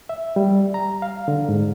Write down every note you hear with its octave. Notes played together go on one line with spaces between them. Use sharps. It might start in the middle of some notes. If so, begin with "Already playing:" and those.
E5
G3
A#5
F5
D3
G#2